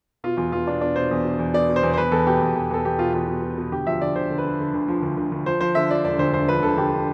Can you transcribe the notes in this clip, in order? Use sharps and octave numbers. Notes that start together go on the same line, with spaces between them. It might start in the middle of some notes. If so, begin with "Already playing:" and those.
B2 F4
E2 F4
E2 F4
B2 D4
B2 D4
B2 C5
E2
B2
E2
B2 D5
B2
C5
E2
C5
E2 B4
E2 A4
B2 G4
E2
E2
E2 A4
E2 G4
B2 F4
E2 F4
B2
B2
B2
D2 G4
F3 E5
D3 D5
D3 C5
D3
B4
D3
D3
D2
F3
D2
D2
D2
F3 C5
F3 C5
D3 E5
F3 D5
E1 D5
D2 C5
E1 C5
F3 B4
D3 A4
D3 G4